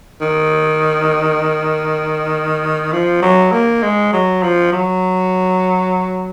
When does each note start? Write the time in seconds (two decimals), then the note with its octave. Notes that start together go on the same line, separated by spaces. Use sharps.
0.21 D#3
2.92 F3
3.22 F#3
3.52 A#3
3.82 G#3
4.13 F#3
4.42 F3
4.72 F#3